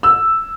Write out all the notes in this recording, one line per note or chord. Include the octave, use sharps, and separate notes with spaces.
E6